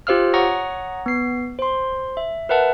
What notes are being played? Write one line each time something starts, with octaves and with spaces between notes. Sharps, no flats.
F4 G4 C5 F5 E6 F6
C#5 F#5 A#5 C#6 D#6 A#6
B3 C7
C5 C6
E5
A#4 B4 E5 F#5 A5